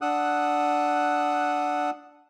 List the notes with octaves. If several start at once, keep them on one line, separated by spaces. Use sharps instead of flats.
D4 F#5 D#6 E6 F#6